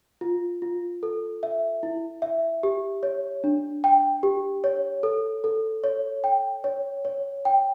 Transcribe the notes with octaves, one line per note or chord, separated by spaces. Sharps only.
F4
F4
A4
E5
E4
E5
G4
C#5
D4
G5
G4
C#5
A4
A4
C#5
G5
C#5
C#5
G5